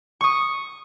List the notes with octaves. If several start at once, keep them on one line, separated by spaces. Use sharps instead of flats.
C#6 D#6